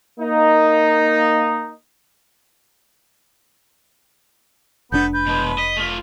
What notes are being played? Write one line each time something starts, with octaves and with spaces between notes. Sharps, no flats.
A#3 D#4
F1 C3 B3 D4 A4 G6
B4 G6
B2 G#3
D#5 B6
A3 F4